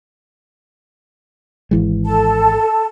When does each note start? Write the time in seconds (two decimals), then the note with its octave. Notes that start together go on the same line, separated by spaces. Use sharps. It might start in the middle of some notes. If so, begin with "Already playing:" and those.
1.71 G#1 E3 G#3
2.05 A4 A5